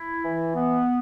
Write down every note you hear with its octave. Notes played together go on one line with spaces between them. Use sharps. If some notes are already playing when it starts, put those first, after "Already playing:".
Already playing: E4
E3
B3